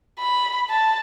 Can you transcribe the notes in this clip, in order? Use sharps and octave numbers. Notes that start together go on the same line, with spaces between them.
B5
A5